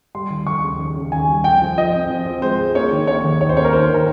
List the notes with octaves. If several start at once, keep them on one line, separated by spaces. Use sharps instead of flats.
G3 C6
D#2
D#2 C#6
C#3
D#2
C#3
D#2 G#5
G3
F3 G5
F3
F3 D#5
C4
F3
C4
G#3 C5
G#3
A#3 C#5
D#3
A#3 C#5
D#2
D#3 C#5
C5
A#3 C#5
A#4
D#3 C5
D#3
A#4